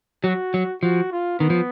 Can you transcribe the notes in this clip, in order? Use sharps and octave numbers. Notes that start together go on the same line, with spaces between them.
F#3 F#4
F#3
F3 F#4
F4
D#3 B3
F3